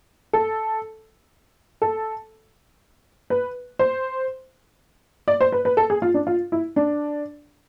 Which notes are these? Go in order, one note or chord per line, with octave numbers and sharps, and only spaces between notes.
A4
A4
B4
C5
D5
C5
B4
B4
A4
G#4
F4
D4
F4
E4
D4